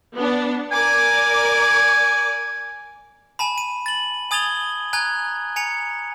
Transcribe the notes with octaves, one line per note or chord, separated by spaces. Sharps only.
B3 D4
A#4 D5 G#5 D6
G#5 A5 B5
D#7
A6 F#7
G#5 D#6 G#6 A6 F7 G7
G#5 A#5 F#6 G#6
G#5 A#5 C#7 F7